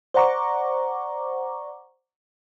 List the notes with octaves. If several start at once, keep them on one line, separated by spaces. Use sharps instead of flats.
C5 D5 F#5 A#5 C#6 D6